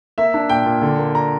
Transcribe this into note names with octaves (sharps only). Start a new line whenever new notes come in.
A#3 E5
D4
A#2 G5
A#2
D3
A#3
A#5